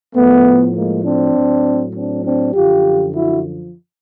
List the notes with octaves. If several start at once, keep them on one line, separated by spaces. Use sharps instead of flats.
A2 F3 A3 B3
G#3 A#3
C4 D4
A2 F#3
C4 D4
C4 D4
F#2 D3 F3 F4 G4
E4 F#4